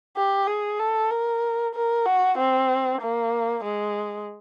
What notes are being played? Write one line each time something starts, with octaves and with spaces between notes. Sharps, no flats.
G4
G#4
A4
A#4
A#4
F#4
C4
A#3
G#3